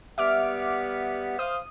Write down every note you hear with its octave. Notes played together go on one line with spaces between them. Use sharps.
G3 B3 E5 F#5 D6 F6
C5 F5 D#6